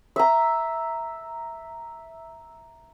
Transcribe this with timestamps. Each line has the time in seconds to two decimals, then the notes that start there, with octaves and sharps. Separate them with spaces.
0.16 E5 A#5